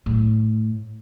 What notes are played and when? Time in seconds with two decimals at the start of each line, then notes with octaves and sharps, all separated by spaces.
0.06 A2